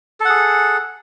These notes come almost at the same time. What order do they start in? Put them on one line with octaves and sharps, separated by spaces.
A4 F#5 G#4